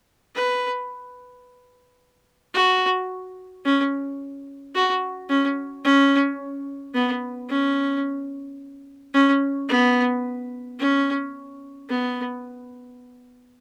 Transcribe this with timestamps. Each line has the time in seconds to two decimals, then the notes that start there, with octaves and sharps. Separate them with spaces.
0.36 B4
2.54 F#4
3.65 C#4
4.75 F#4
5.30 C#4
5.84 C#4
6.94 B3
7.49 C#4
9.14 C#4
9.69 B3
10.79 C#4
11.89 B3